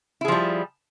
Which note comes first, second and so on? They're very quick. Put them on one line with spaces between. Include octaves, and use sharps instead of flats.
E4 G#4 F3 G3